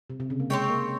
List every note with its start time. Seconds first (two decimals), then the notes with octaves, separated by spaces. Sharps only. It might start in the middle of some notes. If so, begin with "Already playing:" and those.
0.10 C3
0.20 C3
0.30 C#3
0.40 A#3
0.50 G#3 C4 G4 C#5 G5
0.70 A#3